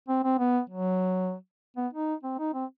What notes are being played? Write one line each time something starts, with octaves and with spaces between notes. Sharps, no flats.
C4
C4
B3
F#3
B3
D#4
C4
D#4
C4